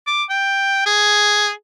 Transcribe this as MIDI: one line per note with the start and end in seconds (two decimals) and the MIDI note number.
0.07 0.24 86
0.30 0.84 79
0.86 1.51 68